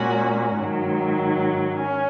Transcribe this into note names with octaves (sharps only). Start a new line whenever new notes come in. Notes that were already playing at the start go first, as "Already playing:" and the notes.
Already playing: A#2 G#3 C#4 F#4
G#2 D#3 F#3
C#4